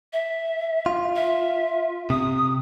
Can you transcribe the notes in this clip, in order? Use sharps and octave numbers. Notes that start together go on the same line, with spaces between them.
E5
F4
E5
C3 D#6